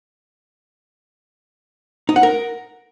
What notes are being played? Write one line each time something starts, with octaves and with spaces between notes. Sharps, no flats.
D#4
F#5
A#4